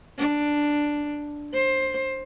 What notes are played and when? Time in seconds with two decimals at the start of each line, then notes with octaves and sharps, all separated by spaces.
0.18 D4
1.53 C5